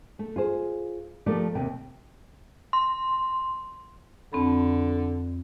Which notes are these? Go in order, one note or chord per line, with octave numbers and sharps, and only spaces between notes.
A3
F4 G#4 C5
F3 A3 G4 A#4 D5
D#2 C3 G5
C6
F2 D3 C4 B5